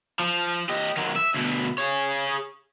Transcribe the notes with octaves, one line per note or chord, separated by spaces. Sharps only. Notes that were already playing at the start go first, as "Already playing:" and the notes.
F3
G4 D#5
D#3 F#3
E5
D2 B2
G#4 C#5